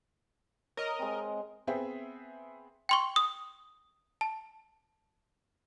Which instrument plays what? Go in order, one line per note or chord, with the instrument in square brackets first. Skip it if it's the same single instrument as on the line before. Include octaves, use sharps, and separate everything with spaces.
[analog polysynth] A#4 D#5 [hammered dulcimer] C#5
[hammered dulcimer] G#3 C4
[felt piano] B3 C4 G#4 E5 G5
[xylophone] G5 C6 C#6
D#6
A5